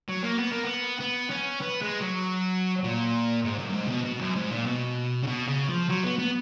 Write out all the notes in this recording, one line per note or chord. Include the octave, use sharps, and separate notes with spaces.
F#3
A#3
B3
A#3
B3
B3
C#4
B3
G#3
F#3
A#2
G#2
F#2
F#2
G#2
C#3
B2
B2
F#2
G#2
A#2
B2
C#3
B2
C#3
F3
F#3
B3
B3